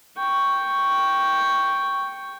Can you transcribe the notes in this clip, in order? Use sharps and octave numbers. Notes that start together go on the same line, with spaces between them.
G5 C#6